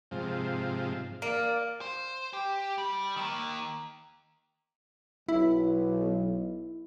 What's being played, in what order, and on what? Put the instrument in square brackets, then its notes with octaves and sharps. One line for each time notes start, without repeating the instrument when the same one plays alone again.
[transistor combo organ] G#2 C3 F3
[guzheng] A#3 [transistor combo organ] D5
[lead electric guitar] C5
G4
G3
D#3 A#3
[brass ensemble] B1 [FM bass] E4